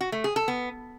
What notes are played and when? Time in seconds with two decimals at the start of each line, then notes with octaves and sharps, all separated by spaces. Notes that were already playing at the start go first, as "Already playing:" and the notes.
0.01 F#4
0.12 A3
0.24 G#4
0.36 A4
0.48 B3